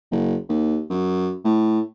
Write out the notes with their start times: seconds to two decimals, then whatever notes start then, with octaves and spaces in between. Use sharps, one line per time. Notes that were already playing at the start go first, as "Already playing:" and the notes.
0.11 F#1
0.49 D#2
0.90 F#2
1.45 A2